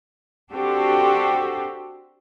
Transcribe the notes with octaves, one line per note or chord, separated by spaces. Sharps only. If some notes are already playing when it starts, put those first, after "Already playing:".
C4 D4 F#4 G4 A4 C5